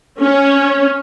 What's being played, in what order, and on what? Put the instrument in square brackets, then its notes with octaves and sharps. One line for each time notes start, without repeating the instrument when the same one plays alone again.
[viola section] C#4